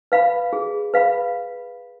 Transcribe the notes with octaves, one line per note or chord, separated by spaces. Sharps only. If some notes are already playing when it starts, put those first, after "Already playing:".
B4 F5 B5
G#4
B4 F5 B5